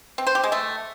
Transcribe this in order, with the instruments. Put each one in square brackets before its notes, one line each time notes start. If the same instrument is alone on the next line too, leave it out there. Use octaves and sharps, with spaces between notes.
[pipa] C4
C5
G4
G#3
A3